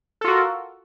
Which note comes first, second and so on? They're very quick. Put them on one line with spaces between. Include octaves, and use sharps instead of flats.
A4 F4 F#4 A#4